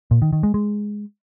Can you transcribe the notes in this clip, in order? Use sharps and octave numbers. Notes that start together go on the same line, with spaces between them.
A#2
D#3
D#3
G#3
G#3